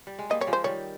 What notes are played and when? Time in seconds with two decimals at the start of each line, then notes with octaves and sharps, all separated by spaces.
0.07 G3
0.19 G#3
0.30 G3 A#3 D#5
0.41 G3 C#5
0.47 F3 G#3
0.53 C5
0.64 D#3 G3 C#5